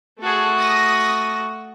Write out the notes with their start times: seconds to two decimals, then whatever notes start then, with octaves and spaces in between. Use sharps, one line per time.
0.20 A3 F#4 G#4 A4
0.59 D#6 A#6